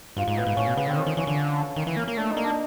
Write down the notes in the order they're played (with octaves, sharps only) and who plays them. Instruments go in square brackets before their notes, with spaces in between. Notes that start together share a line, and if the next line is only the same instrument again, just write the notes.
[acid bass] G2 [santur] F4
[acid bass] G#2
[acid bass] A2 [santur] B3
[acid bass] G#2
[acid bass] A2 [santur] C#4
[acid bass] B2
[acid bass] C#3 [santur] B3
[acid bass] D3 [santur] C4
[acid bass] D#3 [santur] C#4
[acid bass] D#3
[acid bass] E3 [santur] C#4
[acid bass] D3
D#3
E3
A#3
A#3
[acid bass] A3 [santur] D4
[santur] D#4
[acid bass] A#3
[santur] D4